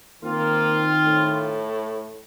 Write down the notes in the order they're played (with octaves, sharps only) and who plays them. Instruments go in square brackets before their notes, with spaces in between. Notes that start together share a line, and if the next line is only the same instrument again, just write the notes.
[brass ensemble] D#3 C4 F4 [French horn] A#3
[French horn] A2